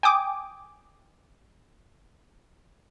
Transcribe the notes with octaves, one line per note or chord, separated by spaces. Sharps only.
G5 G#5 D6 D#6